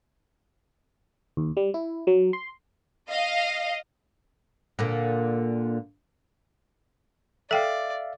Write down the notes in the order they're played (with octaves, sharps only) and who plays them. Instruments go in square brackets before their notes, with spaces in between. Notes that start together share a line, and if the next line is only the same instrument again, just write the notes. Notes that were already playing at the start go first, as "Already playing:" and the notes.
[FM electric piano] D#2
G3
E4
F#3
C6
[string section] D#5 F5
[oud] A#2 D3 A#3
[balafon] A4 G5 [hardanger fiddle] D5 [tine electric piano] E5 F5